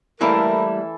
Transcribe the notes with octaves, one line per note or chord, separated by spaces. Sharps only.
E3 G3 A3 A#3 E4 A4 A#4